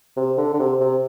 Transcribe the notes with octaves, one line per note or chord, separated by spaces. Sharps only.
C3
D3
D3
C3
C3